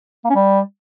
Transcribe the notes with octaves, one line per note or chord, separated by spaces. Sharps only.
A#3
C#4
G3